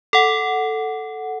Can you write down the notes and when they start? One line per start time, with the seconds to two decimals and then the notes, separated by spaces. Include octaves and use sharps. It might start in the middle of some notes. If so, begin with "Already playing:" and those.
0.13 A4 F#5